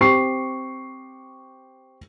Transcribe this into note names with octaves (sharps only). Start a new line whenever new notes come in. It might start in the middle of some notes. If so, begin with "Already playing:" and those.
C4 G4 C#6 C7